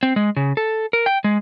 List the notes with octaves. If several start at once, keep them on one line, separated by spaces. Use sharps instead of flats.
C4
G#3
C#3
A4
A#4
G5
G#3